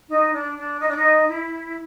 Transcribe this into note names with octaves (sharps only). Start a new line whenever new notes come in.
D#4
D4
D4
D#4
D4
D#4
E4